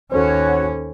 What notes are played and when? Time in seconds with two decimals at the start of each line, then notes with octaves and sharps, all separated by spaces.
0.12 D#2 C#4 F#4 A4 C5 C#5